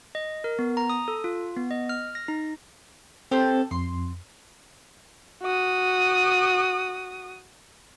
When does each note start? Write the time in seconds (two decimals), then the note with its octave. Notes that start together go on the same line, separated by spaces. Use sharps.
0.15 D#5
0.44 A#4
0.59 B3
0.77 A#5
0.90 D#6
1.08 A4
1.24 F4
1.57 B3
1.71 D#5
1.89 F6
2.15 A#6
2.28 D#4
3.31 C4 G4 A4 C5
3.71 F2 C6
5.42 F#4 D#6